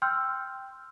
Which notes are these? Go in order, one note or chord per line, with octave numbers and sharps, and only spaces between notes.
G5 C6 E6 F6 G6